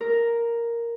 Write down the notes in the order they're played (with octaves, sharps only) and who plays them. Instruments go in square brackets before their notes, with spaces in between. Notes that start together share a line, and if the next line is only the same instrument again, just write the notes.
[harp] A#4